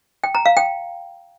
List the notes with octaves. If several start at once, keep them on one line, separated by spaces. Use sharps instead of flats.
G5
A#5
F5
G5